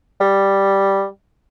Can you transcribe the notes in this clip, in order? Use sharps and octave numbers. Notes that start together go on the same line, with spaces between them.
G3